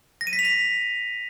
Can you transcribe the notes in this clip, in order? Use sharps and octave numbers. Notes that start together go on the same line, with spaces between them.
A#6
D#7
B6
F7
B6